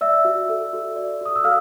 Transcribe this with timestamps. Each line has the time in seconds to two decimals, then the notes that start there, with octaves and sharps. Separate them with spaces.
0.01 D5 E5 E6
0.25 F#4
0.49 A4
0.73 F#4
0.96 D5
1.21 F#4 D#6
1.36 E6
1.44 A4 F5 F6